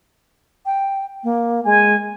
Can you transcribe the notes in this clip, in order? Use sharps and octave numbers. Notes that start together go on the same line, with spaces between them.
G5
A#3
G#3 G#5